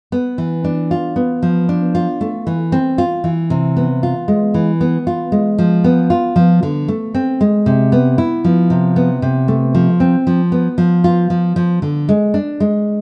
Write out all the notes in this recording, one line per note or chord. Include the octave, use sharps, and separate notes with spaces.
B3
E3
D4
F4
B3
F3
D4
F4
A3
E3
C4
F4
E3
C3
B3
F4
G#3
E3
B3
F4
G#3
F3
B3
F4
F3
D3
A3
C4
G#3
C3
B3
E4
F3
C3
B3
C3
A3
F3
C4
F3
B3
F3
F4
F3
F3
D3
G#3
D4
G#3